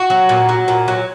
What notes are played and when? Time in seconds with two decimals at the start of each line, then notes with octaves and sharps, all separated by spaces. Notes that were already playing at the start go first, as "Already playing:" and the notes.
Already playing: F#4
0.10 F#3
0.29 A#2
0.49 F#3
0.68 A#2
0.88 F#3